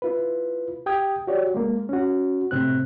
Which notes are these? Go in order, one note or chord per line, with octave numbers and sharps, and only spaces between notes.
E4 F4 B4
G4 G5 D#6 G#6
F#4 G4 C#5 D5
G#3 A#3
C#4 F#4
A2 C3 C4 F#6